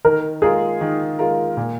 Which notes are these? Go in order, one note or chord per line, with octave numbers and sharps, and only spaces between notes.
D#3 A#4
G#3 F4 G#4 A#4
D#3
G#3 F4 A#4
A#2